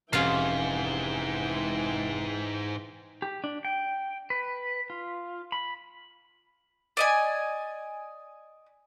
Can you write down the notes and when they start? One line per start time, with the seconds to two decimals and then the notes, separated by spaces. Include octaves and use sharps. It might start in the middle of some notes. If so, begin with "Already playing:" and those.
0.13 F1 G#2 E3 C#4 F4 F5 G5
3.22 G4
3.44 D4
3.65 G5
4.30 B4
4.90 F4
5.52 B5
6.97 D5 D#5 G#5